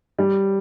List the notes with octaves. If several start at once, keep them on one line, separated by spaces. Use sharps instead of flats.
G3